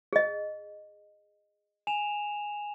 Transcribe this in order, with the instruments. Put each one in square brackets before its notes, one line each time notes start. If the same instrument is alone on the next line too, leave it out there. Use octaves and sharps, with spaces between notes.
[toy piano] G#4 D#5
[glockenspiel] G#5 E7 F7